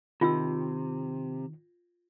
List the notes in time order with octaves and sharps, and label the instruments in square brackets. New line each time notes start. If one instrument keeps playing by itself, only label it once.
[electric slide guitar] C3 [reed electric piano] D#3 [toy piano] F4 G5 E6